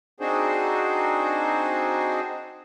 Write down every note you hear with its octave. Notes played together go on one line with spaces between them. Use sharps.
C4 D4 D#4 F#4 G#4 C5